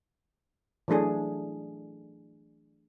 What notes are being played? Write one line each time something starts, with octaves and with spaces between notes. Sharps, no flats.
E3 F#3 A3 D4 G#4 A4